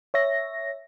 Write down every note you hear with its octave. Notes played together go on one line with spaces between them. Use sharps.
C#5 E5 A#6